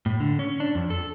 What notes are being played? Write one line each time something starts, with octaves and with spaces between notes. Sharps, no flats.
A2
D3
C#4
D4
F2
A4